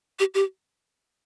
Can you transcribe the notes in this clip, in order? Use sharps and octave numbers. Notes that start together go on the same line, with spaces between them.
G4
G4